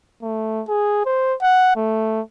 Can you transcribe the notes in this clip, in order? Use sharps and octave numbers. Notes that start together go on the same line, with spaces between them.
A3
G#4
C5
F#5
A3